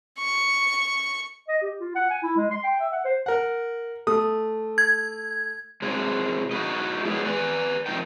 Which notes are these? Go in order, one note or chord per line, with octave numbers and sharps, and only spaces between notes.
C#6
D#5
G4
F4
F#5
G#5
E4
G#3
C6
G5
E5
F#5
C5
A#4 F#5
A3 D#6
G#6
C3 F#3 G#3
D#4 E4 F#4 G4 B4 D#5
F#3 G#3 B3 G4 G#4
B4 D5 G#5
C3 F3 A#3 D4 D#4 G5